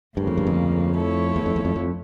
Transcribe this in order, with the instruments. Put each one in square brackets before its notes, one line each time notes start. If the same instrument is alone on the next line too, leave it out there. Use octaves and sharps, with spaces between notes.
[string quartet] D2 C#3 F3 A#3 [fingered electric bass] G2
[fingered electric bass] F2
G2
F2
[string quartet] F3 A3 E4 A4 C#5
[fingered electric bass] E2
F2
E2
F2
F2